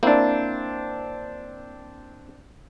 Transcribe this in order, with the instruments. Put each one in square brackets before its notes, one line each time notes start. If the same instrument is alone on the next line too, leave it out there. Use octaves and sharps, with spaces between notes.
[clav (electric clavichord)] A#3 E4 [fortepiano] C4 D4